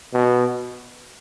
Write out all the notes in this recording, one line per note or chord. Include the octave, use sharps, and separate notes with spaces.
B2